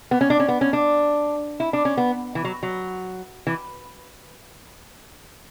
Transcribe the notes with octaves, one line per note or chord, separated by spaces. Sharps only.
B3
C#4
D4
C#4
B3
C#4
D4
E4
D4
C#4
B3
E3
F#3
F#3
E3